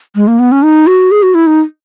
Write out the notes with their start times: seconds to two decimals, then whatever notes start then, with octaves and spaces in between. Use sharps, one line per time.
0.16 G#3
0.28 A#3
0.39 B3
0.52 C#4
0.63 D#4
0.87 F#4
1.11 G#4
1.23 F#4
1.35 E4
1.47 D#4